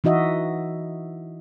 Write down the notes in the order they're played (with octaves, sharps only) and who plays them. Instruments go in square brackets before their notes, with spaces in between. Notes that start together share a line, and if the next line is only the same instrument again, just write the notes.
[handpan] E3 D#4 F#4 D#5 E5